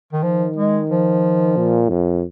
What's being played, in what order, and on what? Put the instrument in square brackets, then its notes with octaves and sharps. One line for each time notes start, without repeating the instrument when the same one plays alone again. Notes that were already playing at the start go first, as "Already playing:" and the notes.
[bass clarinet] D#3
[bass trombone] D#3 [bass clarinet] F3
[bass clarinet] G#3
F3
[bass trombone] A#2
F2